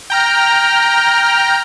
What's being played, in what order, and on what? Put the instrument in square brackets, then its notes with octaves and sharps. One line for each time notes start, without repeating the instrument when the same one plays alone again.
[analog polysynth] G5 A#5 F6